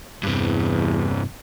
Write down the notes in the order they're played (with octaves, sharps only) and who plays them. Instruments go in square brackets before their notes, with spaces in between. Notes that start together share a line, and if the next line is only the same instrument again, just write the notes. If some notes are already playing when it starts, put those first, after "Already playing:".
[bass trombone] E2 [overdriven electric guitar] G2 C3